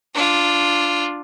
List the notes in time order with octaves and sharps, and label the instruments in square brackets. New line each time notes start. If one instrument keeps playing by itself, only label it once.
[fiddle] D4 F4